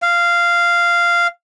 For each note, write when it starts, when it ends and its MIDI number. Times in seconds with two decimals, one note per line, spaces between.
0.02 1.27 77